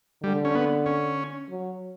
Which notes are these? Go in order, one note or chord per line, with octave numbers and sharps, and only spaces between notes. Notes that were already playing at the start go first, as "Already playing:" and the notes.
D3 G3
C#4
B3
C#4
F#3